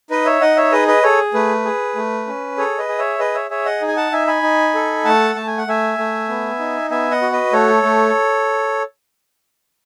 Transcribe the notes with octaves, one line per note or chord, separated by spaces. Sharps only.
D#4 B4 D#5
C#5 E5
D#4 D#5 F#5
C#5 E5
G#4 B4 D#5
B4 D#5
G#4 A4 C#5
A3 B4
G#4
A3
C#4
G#4 A4 C#5
B4 D#5
G#4
C#5 E5
G#4 B4 D#5
C#5 E5
G#4 C#5 E5
D#5 F#5
D#4
G#5
F#5 A5
D#4 E5 G#5
G#5 B5
D#4
A4
A3 F#5 A5
A3 A5
G#5
F#5
A3 E5 G#5
A3
B3
D#4
B3 E5 G#5
D#5 F#5
F#4
B4 D#5
A3 A4 C#5
A3